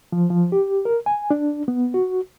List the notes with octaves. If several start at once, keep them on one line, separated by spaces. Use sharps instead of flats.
F3
F3
G4
A#4
G#5
D4
B3
F#4